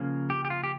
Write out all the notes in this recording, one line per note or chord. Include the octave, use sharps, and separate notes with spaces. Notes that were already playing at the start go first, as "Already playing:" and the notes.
Already playing: C#3 F3 A#3 C#4
G4
G4
F4
G4